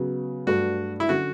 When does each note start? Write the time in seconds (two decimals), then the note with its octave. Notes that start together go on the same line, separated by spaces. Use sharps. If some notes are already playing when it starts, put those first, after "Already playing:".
Already playing: C#3 F#3 B3
0.47 G2 F#3 A3 D4 F#4 A4
1.00 E4
1.09 D3 F#3 C#4 F#4